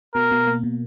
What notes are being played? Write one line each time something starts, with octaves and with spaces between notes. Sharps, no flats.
B2 A#4
B2
A#3
B2